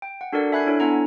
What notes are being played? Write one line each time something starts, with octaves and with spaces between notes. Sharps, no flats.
G5
F#5
D4 F#4 A4 A#4 D5 F#5
E5 G#5 B5 F#6 G#6 C7
D4 E4 A4 C#5
B3 D4 E4 F#5 G#5 A#5